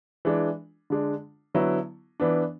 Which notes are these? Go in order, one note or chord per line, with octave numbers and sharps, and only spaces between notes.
E3 G#3 D4
D3 G#3 D4
D3 F#3 B3 E4
E3 B3 D4